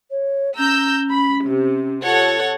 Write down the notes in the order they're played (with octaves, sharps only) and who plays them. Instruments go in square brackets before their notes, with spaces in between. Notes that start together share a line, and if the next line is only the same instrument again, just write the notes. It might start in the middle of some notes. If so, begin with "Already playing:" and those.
[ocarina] C#5
[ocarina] C#4 [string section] A#5 E6 G6
[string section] B5
C3
[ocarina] F4 [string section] A4 C#5 F#5